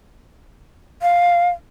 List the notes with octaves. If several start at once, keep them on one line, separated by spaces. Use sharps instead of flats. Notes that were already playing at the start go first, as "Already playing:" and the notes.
F5